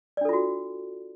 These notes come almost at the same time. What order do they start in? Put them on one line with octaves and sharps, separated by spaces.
D5 D4 A4 F4 F#4